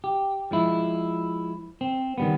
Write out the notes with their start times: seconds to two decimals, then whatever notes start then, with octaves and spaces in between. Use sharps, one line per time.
0.04 G4
0.51 F3 G#3 E4
1.81 C4
2.18 D#3 G3 B3